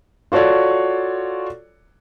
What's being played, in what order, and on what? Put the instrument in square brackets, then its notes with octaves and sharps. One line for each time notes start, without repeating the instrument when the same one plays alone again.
[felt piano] F4 F#4 A4 C#5 D5